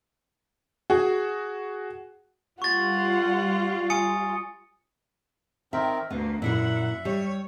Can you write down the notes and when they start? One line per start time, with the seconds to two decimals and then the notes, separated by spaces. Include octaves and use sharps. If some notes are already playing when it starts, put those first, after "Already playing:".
0.90 F#4 G#4
2.62 G3 F4 F#5 C#6 A6
3.90 G#5 D#6 C#7
5.73 D#3 C4 A#4 E5
6.10 D2 G2 A#3 B3
6.42 F#2 A#2 E4 A#4 E5 F#5
7.05 G3 C#5